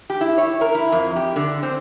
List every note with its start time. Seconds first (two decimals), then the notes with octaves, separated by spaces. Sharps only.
0.10 G4
0.21 E4
0.38 C#5
0.61 A#4
0.75 E4
0.92 F2
1.16 G4
1.36 D3
1.63 C4